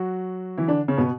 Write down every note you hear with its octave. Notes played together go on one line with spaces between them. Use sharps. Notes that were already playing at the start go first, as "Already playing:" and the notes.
Already playing: F#3 F#4
E3 E4
D3 D4
C#3 C#4
B2 B3